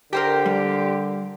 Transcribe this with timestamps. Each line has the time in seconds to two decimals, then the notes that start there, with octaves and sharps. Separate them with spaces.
0.13 D3 G4 A#4 C5 G5
0.46 G3